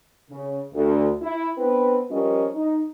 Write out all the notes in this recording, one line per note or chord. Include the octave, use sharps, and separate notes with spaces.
C#3
D2
E4
B3 C4 D4 B4
F3 G3 C#4 F4 A#4 D#5
D#4